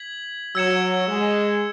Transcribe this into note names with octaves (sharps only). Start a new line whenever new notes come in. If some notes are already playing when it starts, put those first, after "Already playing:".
Already playing: G#6 B6 F#7
F#3 E6 G#6 C#7 E7
G#3